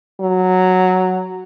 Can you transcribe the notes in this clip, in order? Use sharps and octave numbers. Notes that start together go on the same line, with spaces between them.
F#3